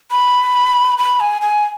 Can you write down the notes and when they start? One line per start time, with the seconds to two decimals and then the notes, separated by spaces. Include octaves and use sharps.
0.11 B5
0.98 B5
1.20 G#5
1.42 G#5